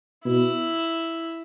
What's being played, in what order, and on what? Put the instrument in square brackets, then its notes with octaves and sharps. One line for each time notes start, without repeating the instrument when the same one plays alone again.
[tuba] B2 [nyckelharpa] E4